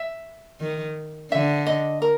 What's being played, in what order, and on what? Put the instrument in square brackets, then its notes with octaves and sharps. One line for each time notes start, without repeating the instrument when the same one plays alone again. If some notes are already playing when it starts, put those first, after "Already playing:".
Already playing: [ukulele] E5
[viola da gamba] D#3
[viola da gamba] D3 [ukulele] E5
[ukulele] D#5
A#4